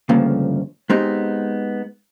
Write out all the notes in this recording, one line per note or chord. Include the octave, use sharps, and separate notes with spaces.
D2 G2 C#3 F3 A3 A#3
G#3 B3 C4 D#4 G4 G#4